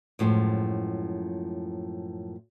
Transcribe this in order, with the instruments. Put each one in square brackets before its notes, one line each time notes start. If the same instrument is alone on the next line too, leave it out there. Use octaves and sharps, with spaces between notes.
[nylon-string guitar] F#2 A2 F3 G#3